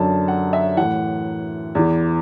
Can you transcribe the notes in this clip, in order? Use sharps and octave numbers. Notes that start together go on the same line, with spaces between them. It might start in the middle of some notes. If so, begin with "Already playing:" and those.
Already playing: F#2 D3 F#3 A5
F#5
E5
A2 E3 F#5
E2 E3